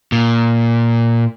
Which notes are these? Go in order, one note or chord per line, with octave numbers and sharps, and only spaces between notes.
A#2